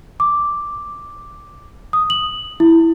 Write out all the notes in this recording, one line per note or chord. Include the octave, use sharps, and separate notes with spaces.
D6
D#6
F#7
E4